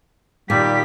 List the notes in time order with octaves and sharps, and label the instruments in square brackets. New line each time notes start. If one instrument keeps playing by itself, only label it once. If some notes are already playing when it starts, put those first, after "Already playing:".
[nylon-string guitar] A#2 D#3 [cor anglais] G3 [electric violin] G4 B6